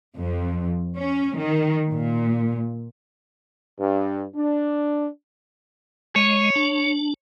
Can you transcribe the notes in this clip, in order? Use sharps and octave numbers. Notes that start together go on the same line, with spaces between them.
F2
C#4
D#3
A#2
G2
D4
G#3 C#5
D4